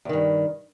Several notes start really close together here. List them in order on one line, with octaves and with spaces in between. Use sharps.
E2 D#3 G2